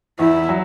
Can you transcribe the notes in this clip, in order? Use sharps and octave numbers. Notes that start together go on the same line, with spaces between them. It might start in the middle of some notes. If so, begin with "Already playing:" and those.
E2 E4
F#3